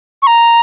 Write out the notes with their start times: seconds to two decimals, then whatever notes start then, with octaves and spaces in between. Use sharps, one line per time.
0.22 C#6
0.27 A#5